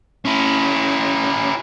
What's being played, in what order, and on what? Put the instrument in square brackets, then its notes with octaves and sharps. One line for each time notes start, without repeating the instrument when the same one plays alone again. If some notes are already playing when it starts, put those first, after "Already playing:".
[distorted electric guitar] C#4 E4